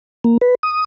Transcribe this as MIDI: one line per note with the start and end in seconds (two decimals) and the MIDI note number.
0.24 0.37 58
0.41 0.55 71
0.63 0.84 87